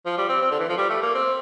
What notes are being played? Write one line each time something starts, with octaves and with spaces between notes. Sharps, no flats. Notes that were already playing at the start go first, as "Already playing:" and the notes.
F3
G3
C4
C4
D3
E3
F3
G3
A3
A#3
C4